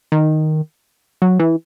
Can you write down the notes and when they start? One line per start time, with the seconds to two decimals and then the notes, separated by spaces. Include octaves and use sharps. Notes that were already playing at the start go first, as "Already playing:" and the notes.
0.12 D#3
1.22 F#3
1.40 E3